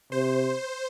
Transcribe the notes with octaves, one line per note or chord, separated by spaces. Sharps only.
C3 C5